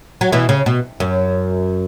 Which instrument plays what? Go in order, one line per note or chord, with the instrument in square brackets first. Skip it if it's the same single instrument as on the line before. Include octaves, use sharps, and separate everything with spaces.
[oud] F#3
B2 E3
C#3
B2
F#2